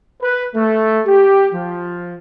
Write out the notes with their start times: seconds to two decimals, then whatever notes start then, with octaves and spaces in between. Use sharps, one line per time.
0.22 B4
0.55 A3
1.07 G4
1.53 F3